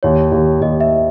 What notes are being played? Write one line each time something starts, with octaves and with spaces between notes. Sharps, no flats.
D#2 C#5
D#2
D#2 D#5
E5